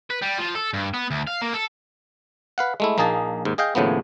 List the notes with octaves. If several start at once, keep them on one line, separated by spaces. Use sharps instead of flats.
B4
G3
F3
A4
G2
B3
D2
F5
A#3
A4
B4 F5 F#5
G#3 A3 E4
A#1 A#3 D#4 G#4 A5
D#2 G#2
G#4 D#5 F5 G5
D#2 A2 C#3 F3 B3